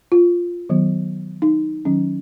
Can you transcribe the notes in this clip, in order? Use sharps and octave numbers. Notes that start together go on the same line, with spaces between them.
F4
D#3 F#3 B3
D#4
D#3 F#3 C#4